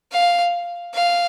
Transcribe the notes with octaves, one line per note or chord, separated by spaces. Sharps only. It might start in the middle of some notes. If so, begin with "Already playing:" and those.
F5
F5